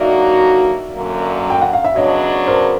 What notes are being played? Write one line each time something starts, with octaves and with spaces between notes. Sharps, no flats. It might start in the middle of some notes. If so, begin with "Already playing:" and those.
Already playing: D3 F#3 A#3 D#4 F#4 D5 E5
F#2 D3 F#3 A#3
G5
F#5
F5
E5
C#3 F#3 B3 D4 C#5 D#5
A#4 C5